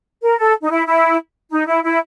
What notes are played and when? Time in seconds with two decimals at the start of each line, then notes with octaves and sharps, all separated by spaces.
0.22 A#4
0.38 A4
0.63 D#4
0.70 E4
0.87 E4
1.51 D#4
1.67 E4
1.83 E4